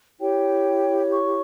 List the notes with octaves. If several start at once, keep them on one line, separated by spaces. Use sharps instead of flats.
E4 G4 C#5 G5
C#6